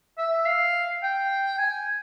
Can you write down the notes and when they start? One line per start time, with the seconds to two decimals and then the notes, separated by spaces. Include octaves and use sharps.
0.18 E5
0.46 F5
1.03 G5
1.58 G#5